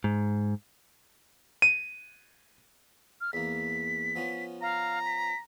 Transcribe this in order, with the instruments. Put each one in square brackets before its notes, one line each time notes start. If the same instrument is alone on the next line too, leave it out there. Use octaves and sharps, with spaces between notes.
[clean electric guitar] G#2
[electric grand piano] D#7
[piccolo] F6
[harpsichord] E2 A#3 [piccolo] B6
[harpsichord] F3 B3 C#4
[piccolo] F5 [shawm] A#5
[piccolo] B6